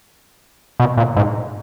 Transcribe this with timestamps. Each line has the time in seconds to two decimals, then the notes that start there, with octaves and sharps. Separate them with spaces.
0.80 B2
0.97 A#2
1.17 G#2